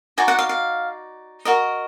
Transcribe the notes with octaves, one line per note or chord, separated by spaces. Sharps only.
D#4 F#4 D5 G#5
F#5
F5
F5
F#4 A#4 D#5